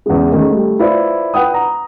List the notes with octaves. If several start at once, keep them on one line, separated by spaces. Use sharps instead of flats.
E2 C#3 G#3
D#3 A3 C#4 G#4
G3 A3
E4 F4 B4 C5 D5
B4 F#5 G5 D#6
A#5